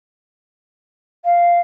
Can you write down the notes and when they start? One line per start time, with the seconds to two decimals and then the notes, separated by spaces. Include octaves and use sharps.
1.25 F5